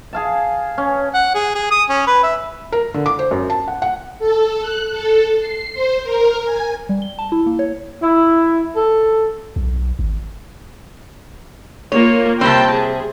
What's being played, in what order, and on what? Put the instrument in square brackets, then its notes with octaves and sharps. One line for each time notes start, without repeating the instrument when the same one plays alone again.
[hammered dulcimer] G#4 F5 A5
C#4
[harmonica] F#5
G#4
G#4
D#6
C#4
B4
E5
[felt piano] A#4
D3
D6
C5
F#2
A5
F#5
F#5
[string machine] A4
F#6
A4
C7
C5
A#4
G#5
[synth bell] G3
G7
A5
E4
A#3
C#5
[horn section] E4
A4
[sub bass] B1
G#1
[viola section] A#3 F4 [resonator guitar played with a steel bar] C#5
[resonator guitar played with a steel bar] C3 G3 C4 [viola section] G5 A5
[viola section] G#4